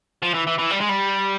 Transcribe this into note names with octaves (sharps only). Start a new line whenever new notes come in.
F3
E3
E3
E3
G3
G#3
G3